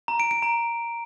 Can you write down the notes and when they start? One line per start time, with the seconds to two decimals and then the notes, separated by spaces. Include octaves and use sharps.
0.08 A#5
0.20 D7
0.31 D7
0.42 A#5